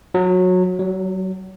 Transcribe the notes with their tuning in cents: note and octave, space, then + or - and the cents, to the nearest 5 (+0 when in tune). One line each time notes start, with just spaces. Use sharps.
F#3 -20
F#3 +30